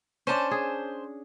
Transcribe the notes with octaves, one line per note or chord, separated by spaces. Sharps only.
C#4 D4 C5 A5
G#4